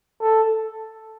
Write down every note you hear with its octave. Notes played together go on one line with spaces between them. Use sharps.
A4